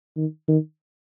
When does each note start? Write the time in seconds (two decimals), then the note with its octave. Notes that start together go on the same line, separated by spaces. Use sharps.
0.16 D#3
0.48 D#3